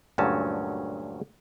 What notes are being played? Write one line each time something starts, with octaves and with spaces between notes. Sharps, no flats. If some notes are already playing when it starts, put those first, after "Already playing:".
D2 G2 A#2 F#3 C#4 A5